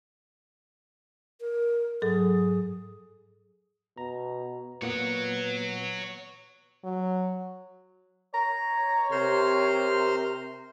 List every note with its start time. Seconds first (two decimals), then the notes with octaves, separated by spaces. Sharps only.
1.41 A#4
2.02 G#2 F#3 G#4 A4
3.98 B2 A#5
4.82 A#2 A#3 B3 B4 C#5 F#5
6.84 F#3
8.34 C#5 A#5
9.12 C3 A#4 C5 C6 F6